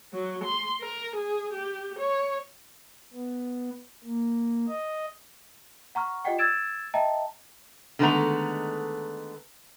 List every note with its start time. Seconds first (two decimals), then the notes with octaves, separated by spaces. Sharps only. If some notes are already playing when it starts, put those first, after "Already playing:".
0.13 F#3
0.44 C6
0.81 A#4
1.16 G#4
1.54 G4
1.99 C#5
3.14 B3
4.04 A#3
4.68 D#5
5.95 F#5 A#5 C#6 F6
6.25 F4 G4 D5 D#5 F#5 G5
6.38 E6 G#6 A6 D7 E7
6.94 D#5 E5 G5 A5 A#5
7.99 D3 D#3 G#3 A3 B3 A#5